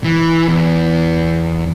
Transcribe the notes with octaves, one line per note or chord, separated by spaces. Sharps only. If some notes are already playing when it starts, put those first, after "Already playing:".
E3
E2